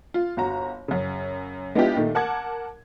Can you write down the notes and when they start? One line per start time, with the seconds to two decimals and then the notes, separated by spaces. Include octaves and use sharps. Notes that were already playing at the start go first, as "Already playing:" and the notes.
0.14 F4
0.37 G1 F#4 A#5
0.88 F#2 C#3
1.75 G#3 B3 D4 E4 F4 G4
1.97 A#2 D#3 A3
2.15 A#4 F#5 A5 D6 G#6